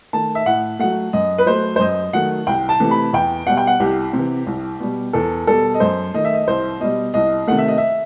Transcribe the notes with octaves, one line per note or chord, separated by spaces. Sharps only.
D#3 A3 A5
E5
A2 F#5
F#3 A3 F#5
F#2 D#5
B4
F#3 A3 C5
C5
F#2 D#5
D#3 F#3 A3 F#5
C2 G5
A5
C3 E3 A3
B5
E2 G5
B2 G3 F#5
G5
F#5
C2 G4
C3
E3
C2
B2 G3
E2 A4
B2 G3 A4
D#5
F#2 C5
D#3 A3 D#5
E5
D#5
C2 C5
B2 G3 D#5
C2 D#5
C3 D#3 A3 F#5
E5
D#5
E5